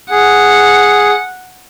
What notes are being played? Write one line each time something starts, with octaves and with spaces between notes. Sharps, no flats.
G#4 F#5